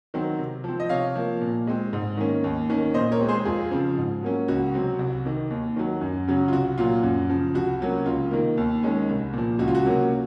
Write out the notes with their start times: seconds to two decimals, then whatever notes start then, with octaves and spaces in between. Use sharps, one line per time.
0.14 D#3 F#3 C4
0.38 C3
0.64 F3 C4
0.80 D#5
0.89 C3 C#5 F5
1.15 F3 A#3
1.41 A#2
1.67 G#3 C4
1.93 G#2
2.17 D#3 A#3 C#4
2.44 D#2
2.70 D#3 A#3 C#4
2.94 A#2 C5 D#5
3.12 A#4 C#5
3.20 G#3 C4
3.28 G#4 C5
3.45 F2 F4 G#4
3.71 C#3 F3 C4
3.97 G#2
4.22 F#3 A#3 C#4
4.48 C#2 F#4
4.74 C3 F#3 C4
4.99 C2
5.25 C3 D#3
5.50 D#2
5.76 D#3 F#3
6.01 F#2
6.28 C#3 F#3 C#4
6.48 F4
6.52 C2 F#4
6.78 A#2 F#3 F4
7.03 F#2
7.30 C#3 F3
7.54 C2 F#4
7.80 C3 F#3 A#3 C#4
8.06 C#2 F4
8.31 C3 D#3 A#3
8.57 D#2
8.83 D#3 G#3 C#4
9.09 C2
9.33 A#2 F3
9.59 C#2 F#4
9.68 F4
9.75 F#4
9.85 C3 F#3 A#3 C#4